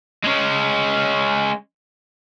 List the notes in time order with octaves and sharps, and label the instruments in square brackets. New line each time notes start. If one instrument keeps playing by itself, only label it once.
[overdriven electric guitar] G#3 C#4